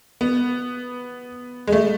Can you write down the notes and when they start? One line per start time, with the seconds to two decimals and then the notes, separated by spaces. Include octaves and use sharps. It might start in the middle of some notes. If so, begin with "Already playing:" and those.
0.21 B3
1.67 G#3
1.72 A3